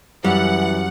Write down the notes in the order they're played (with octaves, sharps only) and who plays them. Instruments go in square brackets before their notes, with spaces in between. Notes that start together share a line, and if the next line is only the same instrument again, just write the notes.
[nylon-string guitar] F#2 [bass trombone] E3 [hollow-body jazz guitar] G3 [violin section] F#5